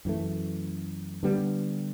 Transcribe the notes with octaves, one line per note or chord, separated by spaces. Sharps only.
F#2 E3 A3
D3 G3 B3